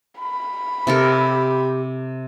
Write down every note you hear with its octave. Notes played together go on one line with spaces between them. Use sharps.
B5
C3 G4 A4 A#4